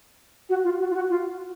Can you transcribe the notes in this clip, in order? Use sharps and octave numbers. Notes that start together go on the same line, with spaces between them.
F#4
F4
F#4
F4
F#4
F4